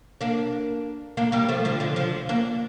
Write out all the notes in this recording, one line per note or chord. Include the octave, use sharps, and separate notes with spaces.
A#3 D4
A#3 D4
G3 A#3
F3 A3
D3 F3
D3 F3
D3 F3
A#3 D4